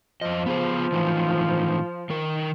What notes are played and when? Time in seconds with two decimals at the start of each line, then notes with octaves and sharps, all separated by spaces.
0.22 F2 F3 D#5
0.46 B3 G#4 C5
0.92 A2 D#3 E3
2.10 D#3 A#4